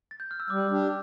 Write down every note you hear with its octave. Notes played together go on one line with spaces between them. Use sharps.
A6
G6
F6
E6
G3 D6
D4 G4